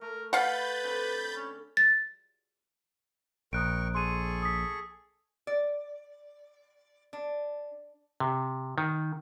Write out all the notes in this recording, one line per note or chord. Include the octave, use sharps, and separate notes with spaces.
A3 A#4
B4 F5 F#5 B5 G6 A6
D3 C4
C#4
A6
A#1 A#4 G5 C#6 D#6 F#6 D7
G#4 A4 C6 C#6 D#7
D#6 B6
D5
D4
C3
D#3